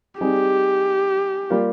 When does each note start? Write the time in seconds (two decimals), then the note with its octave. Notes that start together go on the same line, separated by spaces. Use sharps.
0.21 G3 C4 D#4 G4 G#4
1.50 G3 A#3 F4